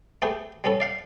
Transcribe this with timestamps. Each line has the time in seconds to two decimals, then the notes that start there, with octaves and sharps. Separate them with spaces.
0.22 A3 B3 G4 G#4
0.64 G3 B3 C#4 A4
0.80 D5 F5 F#5